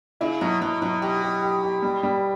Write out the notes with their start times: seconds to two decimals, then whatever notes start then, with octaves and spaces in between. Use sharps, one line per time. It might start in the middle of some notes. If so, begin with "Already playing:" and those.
0.21 C#3 E4
0.41 B2 F#3
0.61 B2 F#3
0.82 B2 F#3
1.02 B2 G4
1.22 G4
1.42 G4
1.63 G4
1.82 G3
2.03 G3